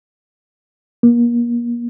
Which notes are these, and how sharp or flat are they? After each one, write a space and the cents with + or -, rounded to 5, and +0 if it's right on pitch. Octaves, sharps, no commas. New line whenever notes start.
A#3 +35